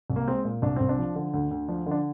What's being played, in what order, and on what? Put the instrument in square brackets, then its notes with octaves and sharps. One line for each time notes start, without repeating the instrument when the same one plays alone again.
[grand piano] C2
A#3
G#3 C4
A#2
C2 D4
C2 C4
D4
F3
D3
D2
D2
F3 D4
D3 D4